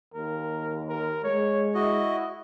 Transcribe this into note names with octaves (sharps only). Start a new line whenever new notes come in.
D#2 A#4
A#4
G#3 C#5
E4 F#4 D#5